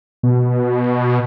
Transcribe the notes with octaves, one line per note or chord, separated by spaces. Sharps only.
B2